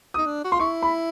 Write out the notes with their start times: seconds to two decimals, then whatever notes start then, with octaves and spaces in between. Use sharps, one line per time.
0.14 D#6
0.18 D#4
0.26 D4
0.44 F#4
0.52 F4 C6
0.59 E4 C#6
0.83 B5